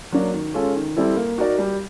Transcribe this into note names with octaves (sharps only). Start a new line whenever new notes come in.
F#3 A#3 D4 F#4
D#3
G#3 C#4 F4 A4
D#3
G3 C4 E4 A4
A#3
D#4 F#4 A#4 D5
G3